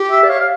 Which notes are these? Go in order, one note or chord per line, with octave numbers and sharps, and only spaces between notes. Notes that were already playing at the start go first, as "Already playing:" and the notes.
Already playing: G4
E5
D5
C#5 F5
F5